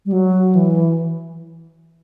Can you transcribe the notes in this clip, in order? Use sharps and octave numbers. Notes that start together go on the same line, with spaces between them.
G3
F#3
E3